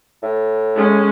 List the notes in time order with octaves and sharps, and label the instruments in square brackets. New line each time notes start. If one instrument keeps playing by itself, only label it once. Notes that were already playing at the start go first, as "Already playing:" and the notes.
[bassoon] A2
[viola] G#3 C#4